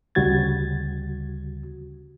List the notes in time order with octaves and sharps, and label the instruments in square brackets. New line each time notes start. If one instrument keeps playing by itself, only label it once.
[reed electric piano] D2 C#3 G3 F#4 G#6 A6